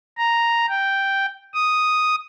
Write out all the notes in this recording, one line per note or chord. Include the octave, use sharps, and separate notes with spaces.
A#5
G5
D#6